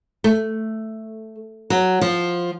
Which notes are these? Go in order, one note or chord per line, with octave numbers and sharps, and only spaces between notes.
A3
F#3
F3